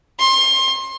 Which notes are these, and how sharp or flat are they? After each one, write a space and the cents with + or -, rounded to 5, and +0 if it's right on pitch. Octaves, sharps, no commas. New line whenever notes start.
C6 +30